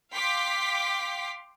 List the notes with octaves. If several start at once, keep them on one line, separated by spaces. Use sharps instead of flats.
F5 G5 C6 D6 B6